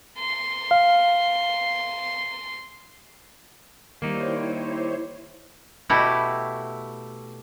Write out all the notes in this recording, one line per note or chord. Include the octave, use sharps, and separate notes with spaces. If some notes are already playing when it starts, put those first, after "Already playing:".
C6
F5
D#3 G3 A#3 D#4 E4 C5 C#5
B2 A3 E4 F#4 G4